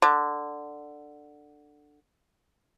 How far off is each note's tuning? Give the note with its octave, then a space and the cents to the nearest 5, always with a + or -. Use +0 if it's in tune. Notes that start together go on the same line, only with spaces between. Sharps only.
D3 +10